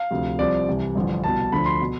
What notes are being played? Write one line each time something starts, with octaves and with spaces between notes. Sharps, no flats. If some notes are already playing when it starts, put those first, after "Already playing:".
Already playing: F5
D2 C3 F3
C2 C3 F3 D5
C2 C3 E3
A1 G2 D3 F3
C2 B2 A5
D2 D3 F3 B5
C6
B2